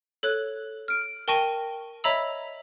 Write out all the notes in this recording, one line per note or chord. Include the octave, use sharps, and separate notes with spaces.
A4 C#5 F#6
F6 D7
A#4 G5 A5 C#6 A#6 D#7
C#5 D#5 E5 A#5 B5 E6